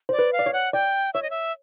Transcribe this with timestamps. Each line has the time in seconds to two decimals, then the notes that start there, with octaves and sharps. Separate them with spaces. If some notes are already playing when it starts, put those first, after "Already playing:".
0.09 C5 D5
0.19 B4
0.33 F5
0.39 D5
0.46 C#5
0.53 F#5
0.73 D5 G5
1.14 C#5 E5
1.23 D#5
1.30 E5